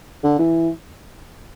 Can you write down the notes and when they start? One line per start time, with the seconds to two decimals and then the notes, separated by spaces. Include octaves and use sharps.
0.24 D3
0.39 E3